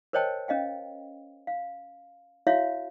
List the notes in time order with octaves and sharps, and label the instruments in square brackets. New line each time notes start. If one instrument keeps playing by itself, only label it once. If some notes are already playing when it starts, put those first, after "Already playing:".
[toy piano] A#4 C5 C#5 D#5 G5 A5
C#4 D#5 F5 G5
F5
E4 F#4 C#5 E5 F5